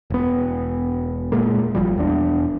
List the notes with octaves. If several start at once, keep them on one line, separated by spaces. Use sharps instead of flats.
E1 B3
A#2 G#3 A#3
G#1 E2 F3 G3
E1 E2 D4